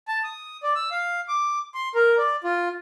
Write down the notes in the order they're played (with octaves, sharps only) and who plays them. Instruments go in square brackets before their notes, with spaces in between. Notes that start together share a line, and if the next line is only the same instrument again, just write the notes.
[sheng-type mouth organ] A5
D#6
D5
E6
F5
D6
C6
A#4
D5
F4